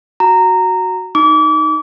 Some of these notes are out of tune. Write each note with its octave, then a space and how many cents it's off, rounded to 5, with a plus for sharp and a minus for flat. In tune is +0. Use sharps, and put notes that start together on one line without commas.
F#4 +0 A#5 -15
D#4 +0 D6 -35